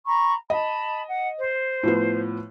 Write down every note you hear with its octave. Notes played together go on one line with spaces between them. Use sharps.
A#5 B5 C#6
D#5 A5 B5
F#5
C5
A2 F3 B3